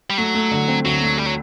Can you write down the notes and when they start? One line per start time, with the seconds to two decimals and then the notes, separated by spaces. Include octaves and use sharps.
0.10 G3
0.18 F#3 A3
0.34 A3
0.51 D3
0.68 C4
0.85 D2 F#3
1.01 A3
1.18 G3
1.26 F#3